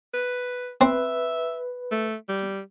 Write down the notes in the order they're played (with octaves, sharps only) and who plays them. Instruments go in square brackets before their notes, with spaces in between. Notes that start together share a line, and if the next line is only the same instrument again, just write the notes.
[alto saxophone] B4
[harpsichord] C4 [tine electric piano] B4 [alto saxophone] E5
[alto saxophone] A3
G3